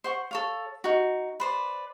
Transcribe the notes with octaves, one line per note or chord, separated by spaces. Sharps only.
C5 F#5 C#6
A4 C#5 F5
D#4 F#4
B4 C5 D5